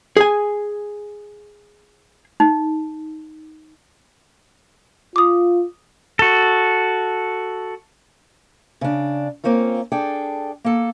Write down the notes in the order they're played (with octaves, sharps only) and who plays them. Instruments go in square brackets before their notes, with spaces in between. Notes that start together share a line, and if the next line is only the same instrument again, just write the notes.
[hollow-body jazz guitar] G#4 G#5
[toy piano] D#4
[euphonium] F4 [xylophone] D6 D#6
[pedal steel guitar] F#4 A4
[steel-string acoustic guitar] C#3 D4
A#3 C4 C#4 F4
D4 G#4 A4 G5
A#3 A4